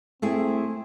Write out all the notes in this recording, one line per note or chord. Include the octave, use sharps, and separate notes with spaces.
A3 C4 E4 G#4